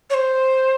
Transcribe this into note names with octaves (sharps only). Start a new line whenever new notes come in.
C#5
C5